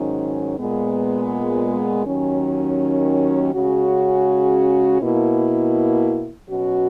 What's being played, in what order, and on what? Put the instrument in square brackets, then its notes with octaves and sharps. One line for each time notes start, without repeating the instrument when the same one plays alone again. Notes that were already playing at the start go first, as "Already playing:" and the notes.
Already playing: [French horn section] G#2 D#3 F#3 C#4
A#2 G#3 B3
D#2 D#3 F#3 C#4
C#3 G#3 C#4 F#4
B2 A#3 E4
B2 F#3 C#4 F#4